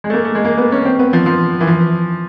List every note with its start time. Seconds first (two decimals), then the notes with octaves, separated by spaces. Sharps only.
0.04 G#3
0.10 A3
0.14 A#3
0.25 A3
0.35 G#3
0.45 A#3
0.58 B3
0.72 C#4
0.85 C4
0.99 B3
1.13 F3
1.26 F3
1.60 E3
1.67 F3